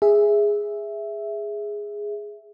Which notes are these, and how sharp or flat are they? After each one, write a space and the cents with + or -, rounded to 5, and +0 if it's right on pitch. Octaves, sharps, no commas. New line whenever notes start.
G#4 -5 E5 +0